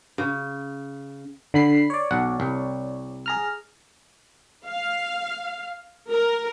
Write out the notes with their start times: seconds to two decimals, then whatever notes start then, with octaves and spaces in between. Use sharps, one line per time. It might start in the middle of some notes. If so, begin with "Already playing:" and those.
0.18 C#3
1.54 D3 B5 C7
1.90 C#5 D5
2.11 B1 F#5
2.40 C2
3.26 G#4 A#5 F6
4.65 F5
6.09 A#4